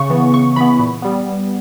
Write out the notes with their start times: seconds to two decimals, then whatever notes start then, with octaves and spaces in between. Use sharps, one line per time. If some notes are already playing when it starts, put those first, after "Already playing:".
Already playing: C#3 C#6
0.10 E3 B3
0.33 C#3 C#6
0.56 E3 B3 B5
0.79 A#2
1.02 G3 B3